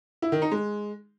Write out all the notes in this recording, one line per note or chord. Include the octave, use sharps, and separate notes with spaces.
E4
D#3
D#4
G#3